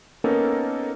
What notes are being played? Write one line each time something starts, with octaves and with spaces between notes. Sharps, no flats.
A#3 B3 C#4 D#4 A4 A#4